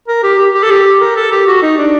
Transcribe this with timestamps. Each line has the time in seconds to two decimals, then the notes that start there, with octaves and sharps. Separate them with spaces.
0.08 A#4
0.23 G4
0.38 G4
0.54 G4
0.63 A4
0.71 G4
1.01 A#4
1.16 A4
1.31 G4
1.47 F#4
1.63 D#4
1.78 D4